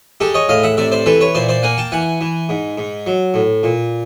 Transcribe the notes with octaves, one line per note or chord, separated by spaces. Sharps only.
G#3 G4 A4
C#5 D#5
A2 D#5 F5
E5 F#5
C3 D5 E5
C5 D5
E3 A4 B4
B4 C#5
A#2 C5 D5
C5 D5
A#3 F#5 G#5
G5 A5
E3 F#5 G#5
E3
G#2
G#2
F#3
A2
A#2